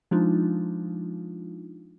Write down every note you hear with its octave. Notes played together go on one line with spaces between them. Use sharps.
F3 G#3 D4 D#4 F4